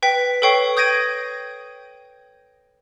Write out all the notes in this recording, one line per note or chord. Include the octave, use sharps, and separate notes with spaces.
B4 G5 B6
A4 B4 C#5 G5 C#6 C7
D#6 G6 G#6 A#6 D7 D#7